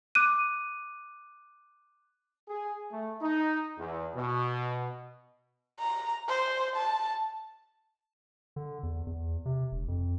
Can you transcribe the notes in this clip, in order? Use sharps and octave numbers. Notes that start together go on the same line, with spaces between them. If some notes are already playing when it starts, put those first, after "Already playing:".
D6 F#6 D#7
G#4
A3
D#4
E2
B2
A#5
C5
A5
D3
E2
E2
C3
E1
F2